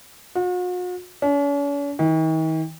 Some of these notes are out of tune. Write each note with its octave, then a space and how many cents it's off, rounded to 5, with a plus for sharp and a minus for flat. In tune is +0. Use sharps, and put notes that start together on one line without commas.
F#4 -45
C#4 +45
D#3 +45